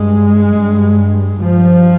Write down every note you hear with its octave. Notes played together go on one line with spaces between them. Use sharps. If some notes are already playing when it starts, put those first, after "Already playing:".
Already playing: G2 G#3
G2
G2 F3